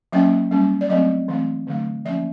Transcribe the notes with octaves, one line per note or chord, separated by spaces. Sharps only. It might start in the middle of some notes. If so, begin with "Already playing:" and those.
F#3 A#3 C#4 E5
G3 A#3 C#4
D5
F#3 A3 C4 D#5
E3 A3 C4
D3 F#3 A3 D4
F3 A#3 C#4 E5